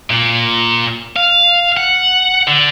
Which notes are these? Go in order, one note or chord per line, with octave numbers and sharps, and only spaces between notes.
A#2
F5
F#5
D3